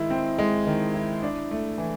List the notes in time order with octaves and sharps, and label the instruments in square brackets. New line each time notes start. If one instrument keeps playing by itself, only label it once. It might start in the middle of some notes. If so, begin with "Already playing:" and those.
Already playing: [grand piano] D#3 G#3 E4
C4
G#3
D#3
E4
D4
A3
E3